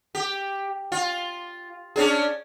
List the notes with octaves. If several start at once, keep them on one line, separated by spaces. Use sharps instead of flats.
G4
F4
C#4 D4 G#4